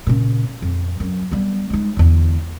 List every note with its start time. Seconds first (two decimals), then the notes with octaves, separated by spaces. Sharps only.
0.07 A#2 C#3
0.62 F2
1.00 F#2
1.32 G3 B3
1.70 G#3 D#4
1.97 E2 D3